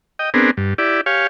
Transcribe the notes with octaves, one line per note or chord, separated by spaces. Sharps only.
D#5 G5
B3 C4 D4 G#4 A#4
G2
E4 G4 D5
G4 C#5 F5 G#5